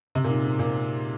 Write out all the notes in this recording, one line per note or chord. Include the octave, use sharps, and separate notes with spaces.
C3
A#2
G#2
G#2
A#2